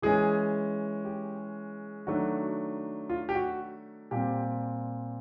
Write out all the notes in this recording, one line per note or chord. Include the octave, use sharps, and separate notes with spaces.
E3 G#3 C#4 G#4
G4
D#3 F#3 A3 D4 F#4
F4
G4
F#4
A#2 G3 C4 G4